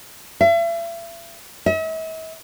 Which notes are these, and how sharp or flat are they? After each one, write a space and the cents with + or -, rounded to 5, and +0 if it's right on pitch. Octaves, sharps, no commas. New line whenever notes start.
E5 +40
E5 -45